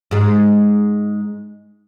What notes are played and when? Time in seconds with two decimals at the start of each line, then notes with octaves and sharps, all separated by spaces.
0.11 G#2 G#3